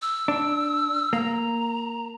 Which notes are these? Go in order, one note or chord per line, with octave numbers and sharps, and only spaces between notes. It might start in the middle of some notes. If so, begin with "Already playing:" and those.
E6
D4
A#3 A#5